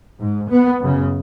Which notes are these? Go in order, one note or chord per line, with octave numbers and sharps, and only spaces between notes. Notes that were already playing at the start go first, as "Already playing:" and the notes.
G#2
B3
F#2 C#3